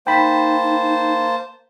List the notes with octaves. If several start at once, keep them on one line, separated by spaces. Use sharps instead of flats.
A#3 D#4 C5 G5 A5 B5